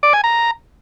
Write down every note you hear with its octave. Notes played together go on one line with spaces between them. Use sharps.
D5
G#5
A#5